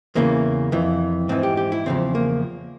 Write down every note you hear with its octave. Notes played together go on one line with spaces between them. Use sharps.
E2 C#3 E3 A#3
F2 E3
G#2 E3 C4
G4
G4
E4
E2 C#3 F3 C4
A#3